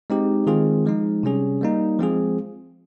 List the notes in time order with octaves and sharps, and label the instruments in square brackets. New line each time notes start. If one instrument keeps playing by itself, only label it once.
[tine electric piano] G#3 C4 D#4 G4
D#3 G#3 C4 F4 G#4
F3 G#3 D#4
C3 G3 C#4 G#4
G3 A#3 D#4
F3 G#3 C4 F4 G#4